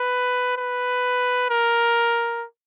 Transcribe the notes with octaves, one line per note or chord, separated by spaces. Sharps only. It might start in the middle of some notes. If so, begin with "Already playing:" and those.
Already playing: B4
B4
A#4